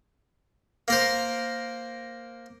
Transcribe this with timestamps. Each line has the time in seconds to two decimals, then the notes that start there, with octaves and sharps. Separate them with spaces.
0.88 A#3 A#4 C5